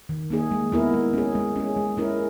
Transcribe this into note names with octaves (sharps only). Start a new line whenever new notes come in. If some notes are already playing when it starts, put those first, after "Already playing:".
D#3
A#3 D#4 G#4
G#3
B3 E4 A#4
G#3
C#4 G#4
G#3
C#4 G#4
G#3
C#4 E4 A#4